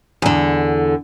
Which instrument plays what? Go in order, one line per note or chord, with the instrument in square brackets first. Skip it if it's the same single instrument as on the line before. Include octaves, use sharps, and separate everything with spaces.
[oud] E2 D3